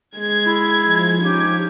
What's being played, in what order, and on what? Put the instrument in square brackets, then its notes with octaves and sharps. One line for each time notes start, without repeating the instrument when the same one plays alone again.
[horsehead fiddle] G#3 [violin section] G#6
[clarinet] E4
[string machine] F3
[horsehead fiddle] C#4 D#4 [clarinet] G4